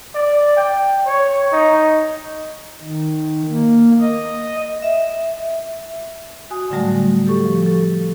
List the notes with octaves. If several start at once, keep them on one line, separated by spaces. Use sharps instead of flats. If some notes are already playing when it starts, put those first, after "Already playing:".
D5
G5
C#5
D#4
D#3
A#3
D#5
E5
F#4 G#5 D#6
A2 D3 F#3 G3 A3
G4 A4 C#6
F3
A4